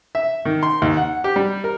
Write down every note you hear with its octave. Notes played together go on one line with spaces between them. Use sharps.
E5
D#3
C6
D#2
F#5
G4
G3
A#4